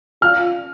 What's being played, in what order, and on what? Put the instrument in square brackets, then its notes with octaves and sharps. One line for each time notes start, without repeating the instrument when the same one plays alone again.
[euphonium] F4 [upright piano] F6